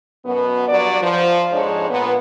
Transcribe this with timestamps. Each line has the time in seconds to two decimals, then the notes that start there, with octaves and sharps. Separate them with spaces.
0.24 F#2 B2 B3
0.67 G2 F#3 D5
1.01 F3
1.51 F2 G#2 G#3 D4 C#5
1.89 A#2 B3